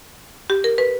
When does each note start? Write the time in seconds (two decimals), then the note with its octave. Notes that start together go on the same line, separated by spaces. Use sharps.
0.50 G4
0.64 A#4
0.78 B4